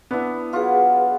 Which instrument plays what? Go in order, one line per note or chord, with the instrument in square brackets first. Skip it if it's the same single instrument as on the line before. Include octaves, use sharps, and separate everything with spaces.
[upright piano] B3 [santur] D4 E4
[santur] F#3 F4 [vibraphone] G#4 B4 F5